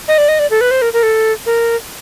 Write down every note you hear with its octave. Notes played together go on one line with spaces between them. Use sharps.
D#5
D5
D#5
D5
A4
B4
C5
A#4
A#4
A4
A#4